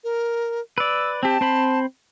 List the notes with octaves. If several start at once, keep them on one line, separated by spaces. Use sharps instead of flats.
A#4
B4 D5 E6
C4 G4 A5
C4 C5 B5